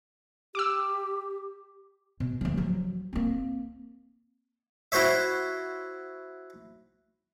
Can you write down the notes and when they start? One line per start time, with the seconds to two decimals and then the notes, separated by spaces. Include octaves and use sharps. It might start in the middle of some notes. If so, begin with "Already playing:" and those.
0.55 G4 D6 E6
2.20 B2
2.41 D2 F3
2.57 F3 F#3
3.13 A#3 C4
4.92 E4 F#4 C5 C#5 E5